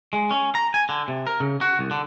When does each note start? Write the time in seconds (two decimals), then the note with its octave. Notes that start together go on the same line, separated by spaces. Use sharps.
0.13 G#3
0.31 C#4
0.55 A#5
0.74 G#5
0.89 D3
1.08 C3
1.27 A#4
1.40 C#3
1.61 F#4
1.79 C2
1.91 D3